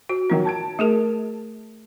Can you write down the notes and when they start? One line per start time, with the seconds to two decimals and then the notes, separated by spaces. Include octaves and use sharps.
0.09 F#4
0.30 D#3 F#3 D#4 A#4
0.45 A5 G#6 D7
0.79 A3 G#4 A#4